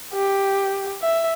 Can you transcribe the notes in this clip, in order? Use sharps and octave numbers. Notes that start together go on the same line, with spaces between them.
G4
E5